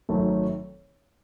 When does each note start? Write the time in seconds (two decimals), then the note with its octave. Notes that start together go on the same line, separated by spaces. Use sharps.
0.09 G#1 F#2 D#3 F#3 A3